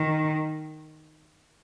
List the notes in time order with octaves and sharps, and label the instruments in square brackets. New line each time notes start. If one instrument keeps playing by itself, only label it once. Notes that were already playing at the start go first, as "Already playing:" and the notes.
Already playing: [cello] D#3